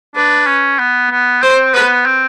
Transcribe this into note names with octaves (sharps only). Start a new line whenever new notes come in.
D4 B4
C#4
B3
B3
C4 C5
B3 B4
C4